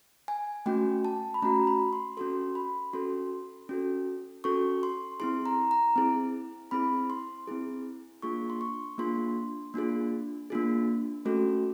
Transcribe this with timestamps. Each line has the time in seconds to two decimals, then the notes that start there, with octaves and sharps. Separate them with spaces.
0.28 G#5
0.66 A3 C#4 F#4 G5
1.05 A5
1.34 B5
1.42 A3 C#4 F#4 A#5
1.67 B5
1.93 C6
2.17 C#4 F#4 A4 C6
2.55 B5
2.93 C#4 F#4 A4 C6
3.69 C#4 F#4 A4
4.44 C#4 F#4 A4 C#6
4.83 C6
5.20 C4 E4 G#4 C6
5.46 A#5
5.71 A#5
5.96 C4 E4 G#4
6.71 C4 E4 G#4 B5
7.10 C6
7.48 C4 E4 G#4
8.22 A#3 D4 F4 G#4 C#6
8.50 C6
8.61 C#6
8.98 A#3 D4 F4 G#4 C6
9.74 A#3 D4 F4 G#4
10.50 A#3 D4 F4 G#4
11.25 A3 C#4 F#4 A4